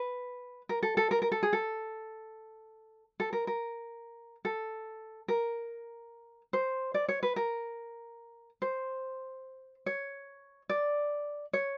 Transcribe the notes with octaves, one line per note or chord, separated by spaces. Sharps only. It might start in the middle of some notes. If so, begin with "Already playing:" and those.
Already playing: B4
A#4
A4
A4
A#4
A#4
A4
G#4
A4
A4
A#4
A#4
A4
A#4
C5
D5
C#5
B4
A#4
C5
C#5
D5
C#5